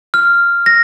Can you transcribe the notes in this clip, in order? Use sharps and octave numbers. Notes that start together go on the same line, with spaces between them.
F6
A#6